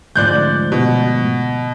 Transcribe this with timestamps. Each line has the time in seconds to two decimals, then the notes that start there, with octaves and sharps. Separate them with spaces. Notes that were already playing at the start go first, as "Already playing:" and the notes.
0.16 D2 G#2 F3 D5 F#6 G6
0.72 B2